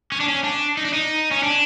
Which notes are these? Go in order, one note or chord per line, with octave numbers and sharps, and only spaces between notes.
C#4
D4
C#4
D4
D#4
D4
D#4
C#4
D4